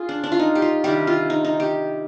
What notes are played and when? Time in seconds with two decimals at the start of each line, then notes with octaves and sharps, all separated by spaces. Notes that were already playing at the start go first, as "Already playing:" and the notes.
Already playing: F4 G#4
0.09 D4
0.24 D4
0.32 F4
0.39 D#4
0.55 G4
0.62 F4
0.84 C3 D#3 G3 D4 G4
1.07 F4
1.30 D#4
1.45 D#4
1.60 G4